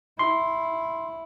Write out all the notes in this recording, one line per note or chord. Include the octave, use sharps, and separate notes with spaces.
E4 C6